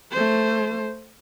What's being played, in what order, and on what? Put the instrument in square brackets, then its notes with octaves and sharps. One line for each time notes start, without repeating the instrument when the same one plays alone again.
[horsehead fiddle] A3 C5